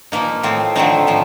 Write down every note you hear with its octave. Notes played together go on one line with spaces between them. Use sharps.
A#2 F3 A#3 D#4
A2 F3 C4
D3 F3 A3 C4 D#4
A2 F3